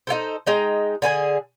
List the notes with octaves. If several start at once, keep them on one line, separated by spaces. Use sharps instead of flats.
D#4 F4 A4 C5
G#3 D#4 G5
D3 G#4 B4 G#5